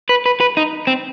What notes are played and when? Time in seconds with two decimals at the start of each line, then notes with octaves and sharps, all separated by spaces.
0.09 B4
0.26 B4
0.40 B4
0.57 D#4
0.87 C4